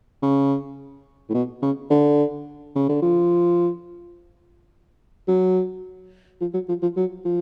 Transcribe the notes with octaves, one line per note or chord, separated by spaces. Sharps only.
C#3
A2
B2
C#3
D3
C#3
D3
F3
F#3
F3
F#3
F3
F3
F#3
F3